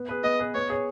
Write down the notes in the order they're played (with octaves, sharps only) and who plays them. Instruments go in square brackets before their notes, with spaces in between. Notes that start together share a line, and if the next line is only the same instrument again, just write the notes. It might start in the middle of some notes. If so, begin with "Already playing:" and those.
Already playing: [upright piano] B3
G#4 B4
[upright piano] B3 [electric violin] D#5
[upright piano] G#4 B4
[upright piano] B3 [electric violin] C#5
[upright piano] G#4 C#5